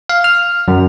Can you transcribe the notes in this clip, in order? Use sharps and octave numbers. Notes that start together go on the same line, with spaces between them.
F5
F6
F#2